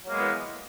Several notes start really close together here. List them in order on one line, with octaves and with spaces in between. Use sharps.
F#3 A#3 G#3 B3 E3